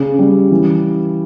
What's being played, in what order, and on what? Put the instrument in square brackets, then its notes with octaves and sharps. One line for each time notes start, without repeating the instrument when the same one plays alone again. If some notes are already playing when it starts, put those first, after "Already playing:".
Already playing: [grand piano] C#3
G3
E3